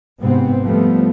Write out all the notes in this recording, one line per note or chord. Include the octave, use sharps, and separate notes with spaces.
G#2 C3 B3 C4
F3 G3 A3 B3